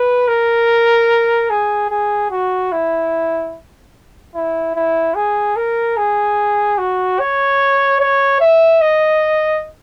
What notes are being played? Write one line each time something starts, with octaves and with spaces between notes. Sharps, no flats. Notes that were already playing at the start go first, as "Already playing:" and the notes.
Already playing: B4
A#4
G#4
G#4
F#4
E4
E4
E4
G#4
A#4
G#4
F#4
C#5
C#5
E5
D#5